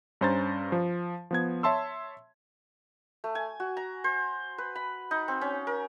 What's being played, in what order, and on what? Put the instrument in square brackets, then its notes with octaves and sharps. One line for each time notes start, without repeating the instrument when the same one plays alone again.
[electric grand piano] G2 C#4 C5 A#5 A6
F3
F3 B3 G#6
C#5 E5 A5 C6 E6
[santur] A3
G#5
F#4
A#5
C5
B4
B5
D#4
C4
C#4
A#4